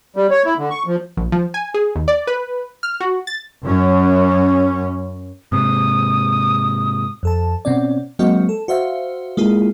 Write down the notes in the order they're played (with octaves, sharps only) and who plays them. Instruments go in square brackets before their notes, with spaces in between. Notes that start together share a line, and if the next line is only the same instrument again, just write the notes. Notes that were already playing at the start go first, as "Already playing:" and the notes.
[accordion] G3
C#5
E4
D3
C#6
F3
[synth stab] A#1
F3
G#5
G#4
D#2
D5
B4
F6
F#4
A6
[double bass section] F#2 C#4
[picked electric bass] G#2 C3 [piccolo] D#6
[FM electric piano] F2 A4 A5
B2 C4 C#4 D5
F#3 G#3 A#3 C4 F#4 D#5
A4
F#4 C5 E5 F5
G#3 A#3 E4 F4 G#4